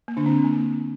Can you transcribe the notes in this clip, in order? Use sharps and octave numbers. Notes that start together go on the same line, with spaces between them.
A#3
D3 D4
C4
A#3